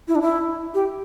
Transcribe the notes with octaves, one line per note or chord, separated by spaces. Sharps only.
E4
D4
E4
G4